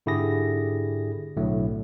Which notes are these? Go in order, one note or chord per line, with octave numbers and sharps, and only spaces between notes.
G#2 D3 E4 G4 G#4 A#6
B1 A2 D3 F#3 A3